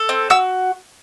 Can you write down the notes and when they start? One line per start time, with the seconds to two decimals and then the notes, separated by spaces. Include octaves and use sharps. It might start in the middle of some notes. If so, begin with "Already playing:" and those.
Already playing: A4
0.09 C4
0.30 F#4 E6